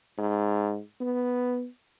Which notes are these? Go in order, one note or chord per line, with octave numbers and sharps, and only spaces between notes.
G#2
B3